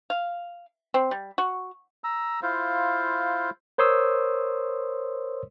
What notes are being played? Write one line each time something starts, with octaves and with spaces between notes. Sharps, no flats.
F5
C4
G3
F#4
A#5 E6
E4 F4 C5 F5
A#4 C5 C#5 C6 D#6 E6